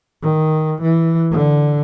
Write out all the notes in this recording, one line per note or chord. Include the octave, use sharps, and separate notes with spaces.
D#3
E3
D3